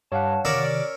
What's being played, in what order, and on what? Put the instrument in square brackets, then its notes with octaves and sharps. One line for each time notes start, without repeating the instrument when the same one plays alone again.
[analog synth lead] G2 [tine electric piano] C#5 F5 F#5 [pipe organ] A5
[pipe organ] C3 D#3 [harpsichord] C#4 A#4 E5 [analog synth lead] D5